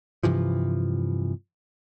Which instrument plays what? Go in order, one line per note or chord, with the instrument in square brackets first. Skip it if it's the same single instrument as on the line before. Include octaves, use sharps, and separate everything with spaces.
[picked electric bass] G2 C3 E3 F3